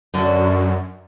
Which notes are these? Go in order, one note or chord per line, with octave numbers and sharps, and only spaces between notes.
F#2 D3 F#4